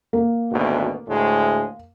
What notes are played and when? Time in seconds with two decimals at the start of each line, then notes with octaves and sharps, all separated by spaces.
0.13 A#3
0.52 G#1 D2 B2
1.08 D2 A2 G#3